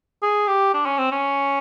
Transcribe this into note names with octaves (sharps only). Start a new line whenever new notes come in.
G#4
G4
D4
C#4
C4
C#4